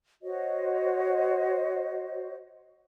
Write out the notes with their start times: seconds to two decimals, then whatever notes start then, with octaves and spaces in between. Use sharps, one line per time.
0.23 F#4 C5 C#5 D#5